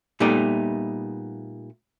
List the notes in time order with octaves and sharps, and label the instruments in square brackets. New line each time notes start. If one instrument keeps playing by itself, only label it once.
[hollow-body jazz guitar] A#2 G3 A3 B3 D#4 G4